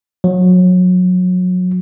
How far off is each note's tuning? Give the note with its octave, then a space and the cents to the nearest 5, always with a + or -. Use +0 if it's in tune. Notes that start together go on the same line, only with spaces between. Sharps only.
F#3 -25